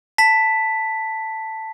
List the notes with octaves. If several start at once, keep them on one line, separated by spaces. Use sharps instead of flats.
A5 B6